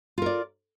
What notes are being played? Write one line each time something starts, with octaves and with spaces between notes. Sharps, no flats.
F4 A#4 D5